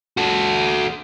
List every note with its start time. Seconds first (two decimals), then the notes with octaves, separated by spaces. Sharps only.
0.17 F#4 A4